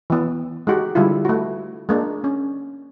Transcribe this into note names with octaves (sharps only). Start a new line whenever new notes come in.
E3 B3
G#3 D#4 F#4 G4
D3 G3 G#3 E4 F4
A3 F#4
G#3 A#3 D4
C#4